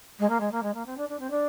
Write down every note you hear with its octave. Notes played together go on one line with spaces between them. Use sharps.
G#3
A#3
G#3
A#3
G#3
A#3
C4
D4
D4
C4
D4